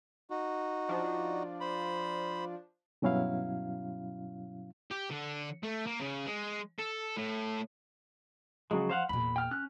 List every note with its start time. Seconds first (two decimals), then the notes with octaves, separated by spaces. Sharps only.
0.30 D#4 F#4
0.89 F3 D4
1.61 C5 B5
3.02 G2 B2 F#3 C#4 E4 F5
4.91 G4
5.10 D3
5.63 A3
5.86 A#3
6.00 C#3
6.26 G#3
6.79 A4
7.17 A2
8.71 C#3 F3 F#3 G#3
8.90 C5 F5 F#5
9.09 E2 A#2 B5
9.36 G5 F6
9.51 C#4 F6 F#6